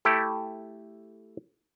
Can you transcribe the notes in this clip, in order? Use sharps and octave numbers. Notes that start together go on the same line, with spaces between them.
A3 E4 G4 A4